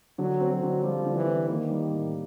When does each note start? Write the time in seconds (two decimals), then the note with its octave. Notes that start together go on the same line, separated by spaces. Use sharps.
0.18 D3 F#3
0.40 C4
0.51 F#3
0.63 D3
0.83 F3 G3
1.05 D3
1.16 E3
1.27 C4
1.48 D#3 A#3
1.70 G3
1.91 A2